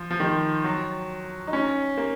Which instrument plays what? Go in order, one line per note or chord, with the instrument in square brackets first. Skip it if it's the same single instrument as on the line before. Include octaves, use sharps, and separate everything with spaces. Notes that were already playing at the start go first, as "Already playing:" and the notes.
Already playing: [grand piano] F3
F3
D#3
F#3
D#4
C#4
A#3